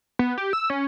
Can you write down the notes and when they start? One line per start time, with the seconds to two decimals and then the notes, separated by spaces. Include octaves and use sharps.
0.19 B3
0.38 G4
0.53 E6
0.70 C#4